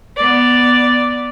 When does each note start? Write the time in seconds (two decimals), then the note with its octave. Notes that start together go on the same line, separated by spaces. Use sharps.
0.16 B3 D5